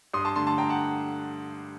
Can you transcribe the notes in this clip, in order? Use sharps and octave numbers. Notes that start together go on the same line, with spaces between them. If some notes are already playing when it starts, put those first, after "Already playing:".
G2 C6 D#6
A5 C6
D3 A3 A5 C6
A5 C6
G2 G5 A#5
F#5 A5